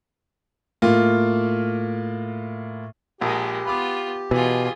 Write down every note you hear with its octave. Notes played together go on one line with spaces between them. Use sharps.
A2 A#3 F4
A#1 A#2 G#3 G4 A#4
B3 F4 B4 B5 D6
B2 E3 F4 G#4